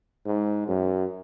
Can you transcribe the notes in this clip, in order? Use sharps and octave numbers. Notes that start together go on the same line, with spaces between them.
G#2
F#2